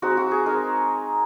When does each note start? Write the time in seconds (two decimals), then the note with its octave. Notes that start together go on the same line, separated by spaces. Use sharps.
0.02 G#3 C4 D#4 F#4
0.17 F#4
0.31 G#4
0.46 G#3 C4 D#4 A#4